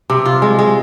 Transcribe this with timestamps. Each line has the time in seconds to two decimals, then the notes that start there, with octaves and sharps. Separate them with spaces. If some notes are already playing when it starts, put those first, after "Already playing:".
0.10 C3
0.25 F4
0.42 G#3
0.59 G#3